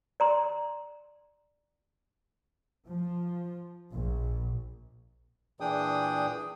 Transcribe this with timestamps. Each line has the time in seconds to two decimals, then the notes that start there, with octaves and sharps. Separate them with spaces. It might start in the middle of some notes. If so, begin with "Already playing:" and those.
0.20 D5 A#5 C6
2.86 F3
3.92 A#1
5.60 A#2 E3 D4 G#4 G5 D#6